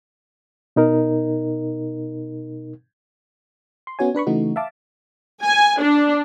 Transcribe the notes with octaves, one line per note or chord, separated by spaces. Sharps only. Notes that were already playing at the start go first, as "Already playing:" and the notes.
B2 D#4 A#4
C6
B3 C#4 F#4 C#5 G#5
D4 B4 B5 C#6
C#3 E3 A3 D#4 F#4
E5 F5 A5 D6
G#5
D4